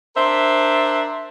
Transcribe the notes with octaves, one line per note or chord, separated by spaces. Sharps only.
D4 A#4 C5 E5